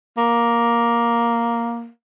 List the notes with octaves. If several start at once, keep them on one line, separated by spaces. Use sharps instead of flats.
A#3